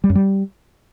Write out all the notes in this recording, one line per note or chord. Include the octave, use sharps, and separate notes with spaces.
G3
F#2
G3